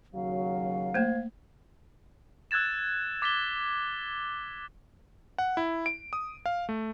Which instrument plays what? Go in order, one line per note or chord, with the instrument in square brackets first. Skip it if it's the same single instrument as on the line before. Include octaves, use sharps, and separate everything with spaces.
[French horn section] D#2 C#3 F#3 [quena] F5
[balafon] A3 A#3 [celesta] C5 G#6
[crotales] E6 F#6 G#6 A6 E7
D6 A6 B6 E7 G7
[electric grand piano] F#5
E4
D7
D#6
F5
A3